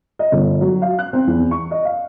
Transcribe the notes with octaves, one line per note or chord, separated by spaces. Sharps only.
D#5
G1
F#3
F5
F#6
C4
E2
C#6
D#5
F5